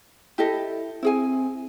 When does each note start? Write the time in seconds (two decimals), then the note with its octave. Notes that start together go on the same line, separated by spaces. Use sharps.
0.38 E4 G4 A4 D#5
1.03 C4 E4 G#4 G#5